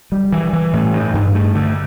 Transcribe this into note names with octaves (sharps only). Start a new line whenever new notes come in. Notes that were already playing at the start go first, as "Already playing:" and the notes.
G3
E3
E3
A2
G2
G2
A3
D3